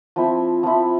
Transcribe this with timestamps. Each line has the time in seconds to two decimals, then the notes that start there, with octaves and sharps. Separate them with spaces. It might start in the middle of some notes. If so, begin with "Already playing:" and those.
0.16 F3 C4 E4
0.63 F3 C4 E4